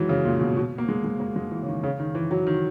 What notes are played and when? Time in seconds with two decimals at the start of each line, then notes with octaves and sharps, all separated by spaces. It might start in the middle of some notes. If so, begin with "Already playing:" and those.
Already playing: D#3 E3 F#3 G#3
0.09 C#3
0.25 A#2
0.41 B2
0.57 B2
0.78 A#3
0.89 G#3
1.04 G#3
1.20 A#3
1.36 G#3
1.51 E3
1.62 C#3
1.68 D#3
1.83 C#3
1.99 D#3
2.15 E3
2.31 F#3
2.47 D#3